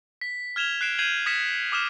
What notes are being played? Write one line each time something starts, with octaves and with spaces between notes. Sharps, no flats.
B6
F6 G#6 E7 F7 G7
F#6 C7 D7 E7
G6 G#6 C7 D#7 F7 F#7
D#6 G#6 A#6 B6 C#7 E7
D6 D#6 F6 E7